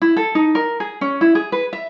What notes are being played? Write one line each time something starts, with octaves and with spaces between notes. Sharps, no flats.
E4
A4
D#4
A#4
G#4
C#4
E4
G#4
B4
E5